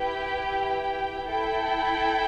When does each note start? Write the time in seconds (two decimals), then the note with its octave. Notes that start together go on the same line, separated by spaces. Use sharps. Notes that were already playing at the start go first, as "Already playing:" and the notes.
Already playing: E4 G4 B4 G5
1.26 E4 A4 G5